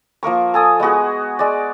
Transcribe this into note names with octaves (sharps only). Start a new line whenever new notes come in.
F3 A#3 A#4 C#6
A4 G#5 D#6
G#3 B3 F#4 G#4
G#3 D5